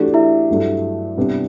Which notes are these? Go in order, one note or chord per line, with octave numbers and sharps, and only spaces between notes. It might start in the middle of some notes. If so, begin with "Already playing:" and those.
Already playing: E3 A3 D4 F#4 G4
E4 E5
G2 F#3 A3
C3 G3 B3 D4